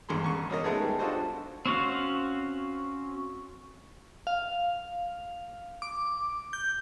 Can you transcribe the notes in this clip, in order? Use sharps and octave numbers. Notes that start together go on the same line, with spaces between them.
A1 E2 G2 G#4 C6
E2 C#6
B2 C#4 A#4 D#5
G#3 A3 B3 D#4 G#4 A4
G3
D4 F4 F#4 A4 C5 D#5
C4 C#4 F#4 F5
F5
D6
G6